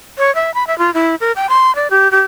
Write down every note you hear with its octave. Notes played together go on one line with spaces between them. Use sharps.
C#5
E5
B5
E5
F4
E4
A#4
G5
C6
D5
G4
G4